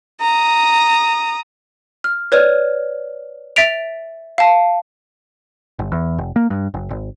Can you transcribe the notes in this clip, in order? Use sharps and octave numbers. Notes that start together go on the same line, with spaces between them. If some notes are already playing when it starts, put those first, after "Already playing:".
A#5 D#6
F6
B4 C#5 D5 F6
E5 A6 B6 D7 F7
F5 A5
G1
E2
F1
A#3
G2
F#1
G#1